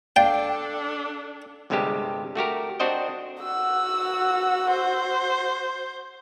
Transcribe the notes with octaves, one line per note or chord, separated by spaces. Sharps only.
D4 A4 D5 F5 G5
G1 G2 C3 G3 G#3 G4
A3 F#4 G4 A#4
C4 D4 F#4 C5 D#5 G5
F#4 F#5 E6
C5